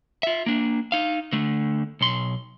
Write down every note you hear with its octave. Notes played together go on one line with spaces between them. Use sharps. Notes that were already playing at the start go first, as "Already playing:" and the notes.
F4 E5
A#3 D4
D#4 F5
D3 A3
B1 C6